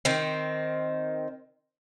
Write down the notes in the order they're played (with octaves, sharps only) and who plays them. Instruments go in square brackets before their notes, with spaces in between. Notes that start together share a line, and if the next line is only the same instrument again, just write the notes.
[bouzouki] D#3 C4